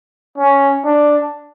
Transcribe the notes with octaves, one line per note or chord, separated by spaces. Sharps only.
C#4
D4